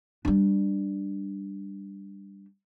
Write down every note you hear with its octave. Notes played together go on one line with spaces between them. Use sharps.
G3 D4